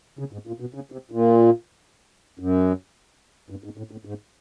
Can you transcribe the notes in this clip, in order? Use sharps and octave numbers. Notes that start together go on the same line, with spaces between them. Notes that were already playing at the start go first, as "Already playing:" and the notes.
C#3
G#2
A#2
B2
C#3
C3
A#2
F#2
G2
G#2
A2
A2
G#2